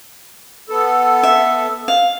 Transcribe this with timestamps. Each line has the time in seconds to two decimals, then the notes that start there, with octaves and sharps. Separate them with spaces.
0.69 B3 A4
1.23 E5
1.88 F5